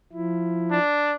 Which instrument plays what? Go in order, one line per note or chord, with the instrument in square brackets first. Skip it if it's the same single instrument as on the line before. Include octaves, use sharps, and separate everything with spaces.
[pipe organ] F3 E4
[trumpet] D4